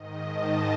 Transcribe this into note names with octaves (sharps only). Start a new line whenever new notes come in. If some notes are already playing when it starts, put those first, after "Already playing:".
Already playing: G#2 D#3 D#5
A5